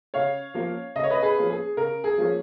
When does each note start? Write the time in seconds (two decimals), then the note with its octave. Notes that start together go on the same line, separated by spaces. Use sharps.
0.14 C#3 C#5 F5
0.54 F3 A#3 C#4
0.95 C#3 D#5
1.04 C#5
1.10 B4 D#5
1.22 G#4 B4
1.36 F3 A#3 C#4
1.50 G#4
1.77 C#3 A#4
2.04 G#4
2.18 F3 A#3 C#4